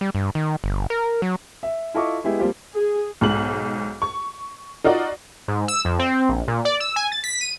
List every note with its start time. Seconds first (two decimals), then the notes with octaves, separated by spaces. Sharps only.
0.01 G3
0.15 G2
0.35 D#3
0.64 G1
0.90 A#4
1.22 F#3
1.63 E5
1.94 E4 F4 A4 D#5 C#6 D6
2.24 G#3 B3 E4 G4
2.39 F3 G3 A#3 C4 F4 G4
2.75 G#4
3.21 B1 G#2 F#7
4.02 C#6
4.84 D#4 F4 F#4 D5
5.48 G#2
5.68 E6
5.85 F2
5.99 C4
6.29 A#1
6.48 A#2
6.65 D5
6.80 E6
6.96 G#5
7.12 A6
7.24 B6
7.41 D#7